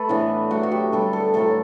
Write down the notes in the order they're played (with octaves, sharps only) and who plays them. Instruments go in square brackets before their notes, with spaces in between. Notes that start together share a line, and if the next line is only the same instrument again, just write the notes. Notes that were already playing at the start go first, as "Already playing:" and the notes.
Already playing: [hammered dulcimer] A3 A4 B4
A2 E3 B3 D4
A2 F#3 A3 F#4
F#4
G4
D3 G3 B3 A4
A4
A2 F#3 A3 A4